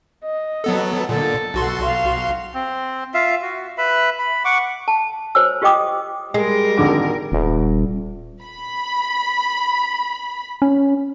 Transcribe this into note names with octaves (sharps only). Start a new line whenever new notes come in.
D#5
F#3 B3 A4
A#2 D3 A4
B1 F#4 C6
F5
C4
F4 E5 F5
F#4
B4 E5 B5
B5
F#5 C#6 D6
A5
F#4 C5 C#5 G#5 E6
F4 G4 D#5 G5 D6 D#6
G3 G#3 A#4
G#1 D3 D6
D#1
B5
C#4